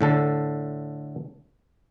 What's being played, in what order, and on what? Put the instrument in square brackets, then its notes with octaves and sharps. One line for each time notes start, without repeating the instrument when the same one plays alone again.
[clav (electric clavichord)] A2 D3 A4